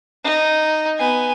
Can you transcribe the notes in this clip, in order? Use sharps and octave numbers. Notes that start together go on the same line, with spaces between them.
D#4
B3 G#5